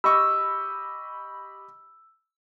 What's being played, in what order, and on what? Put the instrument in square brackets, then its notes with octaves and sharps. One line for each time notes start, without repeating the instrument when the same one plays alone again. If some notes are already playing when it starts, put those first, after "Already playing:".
[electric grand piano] G4 D#5 C#6 [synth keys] B5 [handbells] E6